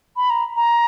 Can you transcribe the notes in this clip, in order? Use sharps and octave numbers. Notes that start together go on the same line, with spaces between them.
B5
A#5
A#5